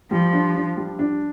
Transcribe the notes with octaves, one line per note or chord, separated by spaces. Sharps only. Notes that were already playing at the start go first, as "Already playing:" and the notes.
F3 G3
D4
D4
G3
D4